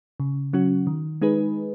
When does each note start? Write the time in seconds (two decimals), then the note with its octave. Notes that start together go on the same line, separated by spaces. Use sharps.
0.20 C#3
0.53 F#3 C#4 F#4
0.87 D#3
1.22 G#3 D#4 G#4 B4